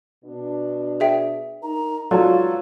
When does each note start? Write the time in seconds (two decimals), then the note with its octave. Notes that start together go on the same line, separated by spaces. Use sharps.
0.25 B2 D4
1.00 G#4 E5 G5
1.63 D#4 A#4 A#5
2.11 F#3 G#3 D#4 F4 A4 B4 D5 F5